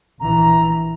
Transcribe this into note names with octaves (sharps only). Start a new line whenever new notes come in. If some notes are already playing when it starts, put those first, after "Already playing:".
A#1 E3 A#5